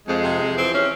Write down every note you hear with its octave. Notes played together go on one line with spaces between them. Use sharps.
F2 G#3
C3
F2
E3 C4
C#4